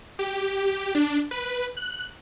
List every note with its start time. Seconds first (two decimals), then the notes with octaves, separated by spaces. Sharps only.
0.19 G4
0.95 D4
1.31 B4
1.77 F#6